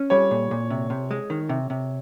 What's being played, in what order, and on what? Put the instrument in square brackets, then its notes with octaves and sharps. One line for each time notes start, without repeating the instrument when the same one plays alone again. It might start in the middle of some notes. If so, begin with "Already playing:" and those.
Already playing: [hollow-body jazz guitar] C#4
[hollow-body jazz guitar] G3 [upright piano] C#5
[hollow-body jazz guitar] A#2
A#2
C3
C3
G#3
D#3
C3
C3